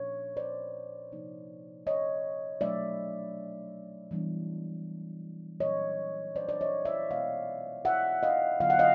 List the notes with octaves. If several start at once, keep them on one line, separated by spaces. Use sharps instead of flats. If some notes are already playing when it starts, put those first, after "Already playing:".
Already playing: A#2 F3 A#3 D4 C#5
C5 D5
C3 F3 A#3 D#4
C#5 D#5
B2 F#3 A3 D4 D5 E5
E3 G3 B3 D4
A#2 F#3 A#3 C#5 D#5
C5 D5
D5
C#5 D#5
D5 E5
B2 G#3 B3 D#5 F5
E5 F#5
D#5 F5
D3 F#3 B3 E4 F5
F#5
D#5 F5